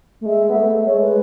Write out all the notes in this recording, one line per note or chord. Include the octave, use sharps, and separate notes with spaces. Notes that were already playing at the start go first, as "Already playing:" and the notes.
A3
G#3 E5
B3
A3
G#3 C#5
G#3 B4